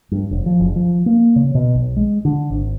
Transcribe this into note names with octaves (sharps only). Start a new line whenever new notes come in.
G2
F1
F3
F#1
F3
A#3
C#3
B2
B1
G#3
D3
G#1